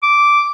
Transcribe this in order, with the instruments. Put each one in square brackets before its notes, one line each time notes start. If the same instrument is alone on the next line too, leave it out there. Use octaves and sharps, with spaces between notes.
[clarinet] D6